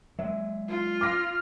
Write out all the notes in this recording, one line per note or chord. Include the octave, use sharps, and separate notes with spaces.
F#3 G#3 E5
F4
D6 F6 A#6